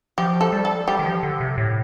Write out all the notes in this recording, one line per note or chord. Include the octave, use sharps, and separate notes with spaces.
F3 G4
A4
G3
A4
G3 G4
D#3
F3
D3
C3
A2